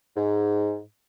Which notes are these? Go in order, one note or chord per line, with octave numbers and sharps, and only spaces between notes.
G#2